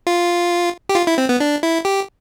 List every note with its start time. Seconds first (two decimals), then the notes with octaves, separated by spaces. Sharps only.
0.07 F4
0.89 G4
0.95 F4
1.07 E4
1.18 C4
1.29 B3
1.40 D4
1.63 E4
1.85 G4